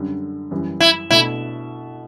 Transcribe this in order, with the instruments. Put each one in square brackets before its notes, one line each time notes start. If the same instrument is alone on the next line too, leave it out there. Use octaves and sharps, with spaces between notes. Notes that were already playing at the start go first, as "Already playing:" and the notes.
Already playing: [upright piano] F#2 D3 G3
F#2 E3 G3
[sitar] E4
[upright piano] B2 A3 D4 [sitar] E4